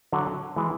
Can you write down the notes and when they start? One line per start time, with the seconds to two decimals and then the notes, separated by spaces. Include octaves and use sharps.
0.12 D3 F#3
0.56 E3 G#3